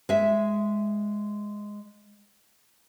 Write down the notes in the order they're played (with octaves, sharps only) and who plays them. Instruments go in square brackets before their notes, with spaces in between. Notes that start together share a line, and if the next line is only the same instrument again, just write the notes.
[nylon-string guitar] G#3 E5